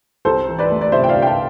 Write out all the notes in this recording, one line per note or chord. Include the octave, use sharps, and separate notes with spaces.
C2 A4 C5
E3
B4 D5
A3
D5
C3 C5 E5
G5
D5 F5
C2
G5
F5 A5